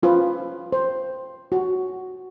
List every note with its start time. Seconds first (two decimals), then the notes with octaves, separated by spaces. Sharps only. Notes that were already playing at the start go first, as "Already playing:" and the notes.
0.03 C#4 F4 B4 C5
0.72 C5
1.52 F#4